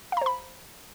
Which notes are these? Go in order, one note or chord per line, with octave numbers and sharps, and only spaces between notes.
C5 F5 A#5 B5